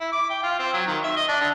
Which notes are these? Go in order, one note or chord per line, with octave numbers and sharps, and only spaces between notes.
E4
D6
G5
F4
C4
F#3
D#3
E5
D#5
D4
D3